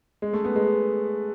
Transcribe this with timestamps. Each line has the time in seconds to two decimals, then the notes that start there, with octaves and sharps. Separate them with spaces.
0.22 G#3
0.33 A3
0.45 B3
0.56 G#3